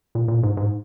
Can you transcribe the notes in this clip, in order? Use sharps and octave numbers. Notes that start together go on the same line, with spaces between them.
A#2
A#2
G#2
G#2